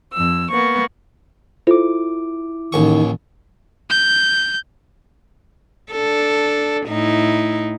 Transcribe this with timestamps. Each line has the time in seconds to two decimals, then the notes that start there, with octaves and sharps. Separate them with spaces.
0.13 F2 E6
0.51 A#3 B3 C#6
1.67 E4 F4 A4 C5 D6
2.72 A1 D#2 D#3 C#6
3.90 G6
5.92 D4 A4
6.87 A2 D#4 E4